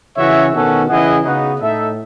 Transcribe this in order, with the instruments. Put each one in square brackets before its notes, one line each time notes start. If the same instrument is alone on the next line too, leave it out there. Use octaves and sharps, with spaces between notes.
[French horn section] C#3 E3 [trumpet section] C#4 F#4 C#5 E5
[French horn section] B2 D#3 [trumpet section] C#4 F#4 A4
[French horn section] C#3 E3 [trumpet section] E4 G#4 D#5 F#5
[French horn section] C#3 [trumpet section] B3 D#4 F#4 B4 F#5
[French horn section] A2 [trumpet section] D#4 A4 E5